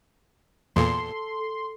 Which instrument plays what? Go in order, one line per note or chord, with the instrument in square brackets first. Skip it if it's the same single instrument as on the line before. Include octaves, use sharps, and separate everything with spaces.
[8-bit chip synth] E2 A#2 [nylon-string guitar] A4 [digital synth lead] C6